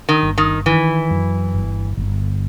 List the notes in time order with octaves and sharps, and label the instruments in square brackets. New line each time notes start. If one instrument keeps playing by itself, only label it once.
[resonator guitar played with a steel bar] D#3
[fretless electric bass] G1
[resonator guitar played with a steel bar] D#3
[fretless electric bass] D#3 [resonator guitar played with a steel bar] E3
[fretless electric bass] F#2
G1
G1